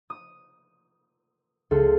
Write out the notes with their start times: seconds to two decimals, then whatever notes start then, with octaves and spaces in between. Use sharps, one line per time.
0.10 D#6
1.71 C#2 A4 C6 F6